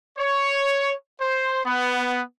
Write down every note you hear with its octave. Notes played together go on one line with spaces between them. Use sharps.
C#5
C5
B3